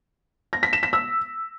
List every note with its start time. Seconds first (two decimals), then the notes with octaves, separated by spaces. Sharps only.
0.53 A#6
0.63 B6
0.73 E7
0.83 B6
0.93 E6